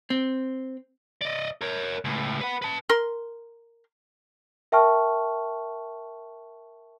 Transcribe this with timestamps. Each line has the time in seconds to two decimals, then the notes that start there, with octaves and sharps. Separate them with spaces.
0.10 C4
1.21 D5 D#5
1.61 A#4 C#5
2.04 C#2 A2
2.41 B4 F#5
2.62 B4 A5
2.89 A#4 C6
4.72 A#4 E5 G5 A5 C#6 F6